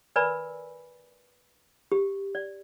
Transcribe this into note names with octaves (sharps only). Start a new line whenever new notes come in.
A#4 B4 D5 G#5 B5 E6
G4
D5